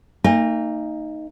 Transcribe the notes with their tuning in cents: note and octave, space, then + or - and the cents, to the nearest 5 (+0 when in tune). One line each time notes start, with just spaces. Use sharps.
A#3 -35 D#4 +0 G#5 -40